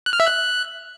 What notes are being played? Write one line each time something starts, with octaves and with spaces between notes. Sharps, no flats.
F#6
F6
E5
F#6